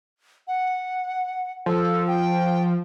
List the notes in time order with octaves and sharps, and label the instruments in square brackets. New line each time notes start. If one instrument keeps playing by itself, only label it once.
[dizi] F#5
[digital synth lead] F3 [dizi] A4
[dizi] G5